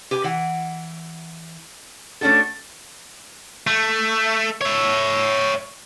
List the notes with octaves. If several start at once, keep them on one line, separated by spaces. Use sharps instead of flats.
G4 B4 G#5
E3 F#5
A3 C#4 D4 F#4 A4
A3
C#5 E5